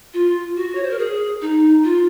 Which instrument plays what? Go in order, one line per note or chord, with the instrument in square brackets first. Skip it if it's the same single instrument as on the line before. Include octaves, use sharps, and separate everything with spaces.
[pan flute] F4
F#4
C#5
C5
A#4
G#4
D#4
F4